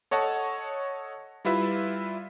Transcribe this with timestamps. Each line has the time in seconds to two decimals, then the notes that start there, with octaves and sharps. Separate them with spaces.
0.11 A4 C#5 D#5 F#5 A5
1.45 G3 E4 F4 B4 E5